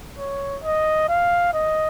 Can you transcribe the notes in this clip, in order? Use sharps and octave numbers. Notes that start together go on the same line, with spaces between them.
C#5
D#5
F5
D#5